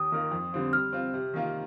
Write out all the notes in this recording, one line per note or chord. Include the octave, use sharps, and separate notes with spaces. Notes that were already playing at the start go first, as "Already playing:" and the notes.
Already playing: D#2 D#6
D#3 A#3 F4 A#4
F2
D3 G3 C4 F4
G3 F6
C4 F4
C3
D#3 A#3 F4